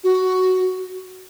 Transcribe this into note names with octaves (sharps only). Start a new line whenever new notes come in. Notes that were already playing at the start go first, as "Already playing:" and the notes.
F#4